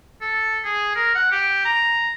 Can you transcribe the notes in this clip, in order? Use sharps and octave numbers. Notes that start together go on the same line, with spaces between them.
A4
G#4
A#4
F#5
G4
A#5